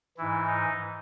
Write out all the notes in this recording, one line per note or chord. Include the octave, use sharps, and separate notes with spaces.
G#2 E3 E4
D#4